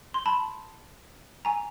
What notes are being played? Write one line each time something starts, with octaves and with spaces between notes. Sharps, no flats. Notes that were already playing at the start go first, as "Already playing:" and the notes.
C6
A5 B5
G#5 A#5